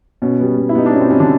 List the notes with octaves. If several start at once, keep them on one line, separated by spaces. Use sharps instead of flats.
B2 C#4
G3 B3
B2
E4
G3 B3 D#4
D4
B2 C#4
C4
G3 B3 C#4
D3 D4